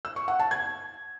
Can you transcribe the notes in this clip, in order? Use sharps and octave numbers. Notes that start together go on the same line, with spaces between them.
E6
C#6
F#5
A5
G#6